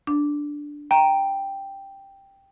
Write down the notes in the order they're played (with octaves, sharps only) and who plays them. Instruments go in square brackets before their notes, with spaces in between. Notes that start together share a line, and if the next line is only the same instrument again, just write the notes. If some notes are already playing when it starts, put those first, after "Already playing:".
[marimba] D4
[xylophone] G5 [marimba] A#5